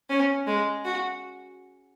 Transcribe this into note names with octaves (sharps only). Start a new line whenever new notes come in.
C#4
G#3
F#4